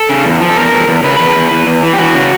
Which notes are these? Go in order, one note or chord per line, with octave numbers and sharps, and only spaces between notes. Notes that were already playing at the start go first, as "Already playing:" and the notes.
Already playing: A4
C#3
E2
F3
A4
E2 A#4
E2
E2
C#3 B4
E2
E2
E2
E2
E3
G4
E3 F#4
C#3